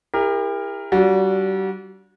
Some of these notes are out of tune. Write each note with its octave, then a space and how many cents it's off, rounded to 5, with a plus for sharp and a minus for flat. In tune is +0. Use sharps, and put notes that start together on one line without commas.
E4 +5 G4 +40 A#4 +0
G3 -35 D4 -15 F#4 -25